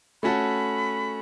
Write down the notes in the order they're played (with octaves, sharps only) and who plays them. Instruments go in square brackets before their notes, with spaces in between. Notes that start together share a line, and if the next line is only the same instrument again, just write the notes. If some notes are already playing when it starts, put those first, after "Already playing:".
[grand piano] A3 C#4 F#4 A4 [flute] B5